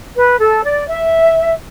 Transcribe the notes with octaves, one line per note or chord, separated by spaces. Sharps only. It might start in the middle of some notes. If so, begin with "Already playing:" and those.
B4
A4
D5
E5